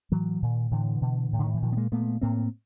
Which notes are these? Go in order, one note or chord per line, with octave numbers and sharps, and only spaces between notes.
A2 E3 F#3
A#2 D#3
A2 D3 E3
B2
A2
D3
D#3
E3
A#2 D#3 F3
B3
G#3 A#3
A#2 A3 B3
A2 A#3 C4